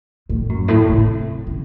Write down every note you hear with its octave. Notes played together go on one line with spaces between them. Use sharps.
A2
F#2
A2
C3
C#3